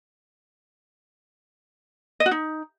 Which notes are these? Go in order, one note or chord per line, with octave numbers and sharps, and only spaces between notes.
D#5
F#4
D#4